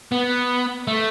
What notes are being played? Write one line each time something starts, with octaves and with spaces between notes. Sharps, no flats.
B3
A3